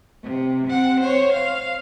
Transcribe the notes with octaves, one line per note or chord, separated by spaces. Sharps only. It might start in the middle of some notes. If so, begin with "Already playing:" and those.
C3
C4 F#5
C5 C#5
F5